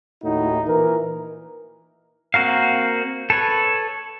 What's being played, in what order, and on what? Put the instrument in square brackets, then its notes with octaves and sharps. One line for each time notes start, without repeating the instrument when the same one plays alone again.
[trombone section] D#2 A2 D#4 E4 F#4
A#2 E3 A#4
[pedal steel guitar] A#3 C4 F#4 A#4 F5
A4 B4 C#5